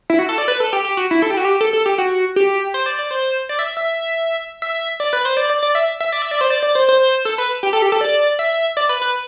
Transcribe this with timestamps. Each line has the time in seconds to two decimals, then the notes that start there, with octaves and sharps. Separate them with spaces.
0.10 E4
0.19 F#4
0.29 A4
0.38 D5
0.48 B4
0.60 A4
0.73 G4
0.85 G4
0.97 F#4
1.11 E4
1.22 A4
1.30 G4
1.37 F#4
1.45 G4
1.61 A4
1.73 A4
1.86 G4
1.98 F#4
2.36 G4
2.74 C5
2.86 D5
2.99 D5
3.11 C5
3.49 D5
3.59 E5
3.77 E5
4.62 E5
5.00 D5
5.13 B4
5.25 C5
5.37 D5
5.50 D5
5.63 D5
5.75 E5
6.00 E5
6.12 D5
6.22 E5
6.31 D5
6.41 C5
6.50 D5
6.63 D5
6.75 C5
6.89 C5
7.25 A4
7.38 B4
7.63 G4
7.73 A4
7.82 G4
7.92 A4
8.01 D5
8.39 E5
8.77 D5
8.89 B4
9.02 B4